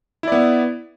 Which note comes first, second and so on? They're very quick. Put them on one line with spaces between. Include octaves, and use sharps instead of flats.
E4 D5 B3